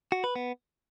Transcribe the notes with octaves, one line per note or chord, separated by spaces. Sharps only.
F#4
B4
B3